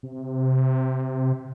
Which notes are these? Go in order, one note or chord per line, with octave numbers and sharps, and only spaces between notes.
C3